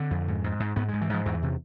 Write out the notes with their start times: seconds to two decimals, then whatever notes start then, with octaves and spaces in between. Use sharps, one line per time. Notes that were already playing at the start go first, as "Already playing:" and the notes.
Already playing: D3 C4
0.11 F2
0.28 G#2
0.44 G#2
0.60 G#2
0.76 G#2 B3
0.89 G#2 G#3
1.01 E3
1.10 G#2 F3
1.25 E2 E3
1.43 C3